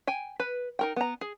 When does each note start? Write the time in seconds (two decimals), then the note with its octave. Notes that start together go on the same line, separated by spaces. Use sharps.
0.07 G5 G#5
0.40 B4
0.79 D#4 A#4 G5
0.96 B3 A#5
1.21 G#4